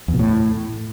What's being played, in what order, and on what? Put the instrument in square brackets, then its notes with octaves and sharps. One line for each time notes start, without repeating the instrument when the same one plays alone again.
[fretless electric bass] E2
B2
A2